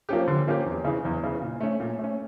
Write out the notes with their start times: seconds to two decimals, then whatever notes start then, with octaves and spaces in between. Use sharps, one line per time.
0.09 F3 A#3 C#4 G4
0.28 D3
0.47 F3 A#3 C#4 G4
0.66 E2
0.85 C#3 E3
1.05 E2
1.24 C#3 E3
1.42 A#2
1.61 A3 C#4
1.80 A#2
1.99 A3 C#4